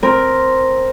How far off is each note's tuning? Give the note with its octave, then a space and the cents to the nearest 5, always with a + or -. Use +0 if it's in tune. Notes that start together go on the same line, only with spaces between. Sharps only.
C4 +0 A#4 +0